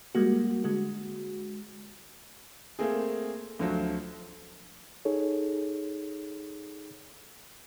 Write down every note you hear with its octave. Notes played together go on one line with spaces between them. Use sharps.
G3 G#3 A#3 F#4
D3 G#3 F#4
A3 A#3 C4 G#4
D2 D3 F3 F#3
D#4 G#4 A4 C#5